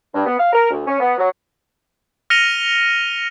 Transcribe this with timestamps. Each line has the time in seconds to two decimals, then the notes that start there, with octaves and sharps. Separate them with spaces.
0.15 G2
0.26 B3
0.39 F5
0.53 A#4
0.71 D2
0.86 C#4
1.00 B3
1.18 F#3
2.30 F6 A#6 C#7 D#7 F7 G7